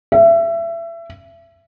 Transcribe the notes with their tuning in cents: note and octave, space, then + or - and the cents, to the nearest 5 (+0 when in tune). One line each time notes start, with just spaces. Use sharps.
E5 +25